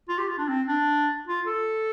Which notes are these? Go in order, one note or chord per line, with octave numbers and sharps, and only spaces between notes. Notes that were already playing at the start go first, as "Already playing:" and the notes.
F4
G4
F4
D4
C4
D4
F4
A4